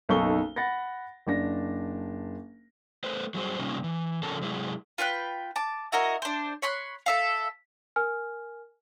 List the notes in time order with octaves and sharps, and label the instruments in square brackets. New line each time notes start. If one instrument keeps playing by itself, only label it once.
[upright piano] F#1 B1 D#4 A4 C#6 G7
F#5 B5 A6 A#6
F#1 D4 A#6
[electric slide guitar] A3 B4 C5
F#3 G3 G#4 C5
C3 G3 A#3 C#4 D#4 F4
E3
C#3 F3 A4 A#4 C#5 A5
C3 F#3 G#3 E4 G#4
[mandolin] F4 B4 G5 F#6
A5 D6
E4 F#4 A#4 D#5
D4 C5
C#5 B5 C6 F#6
A4 E5 F5
[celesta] A#4 G#5 F6